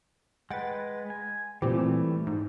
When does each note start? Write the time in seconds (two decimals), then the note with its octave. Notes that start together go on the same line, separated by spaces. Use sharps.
0.50 G#3 B4 F#5 G5 A6
1.10 G#5
1.62 A#2 E3 G3 A3 C4 G4
2.27 G#2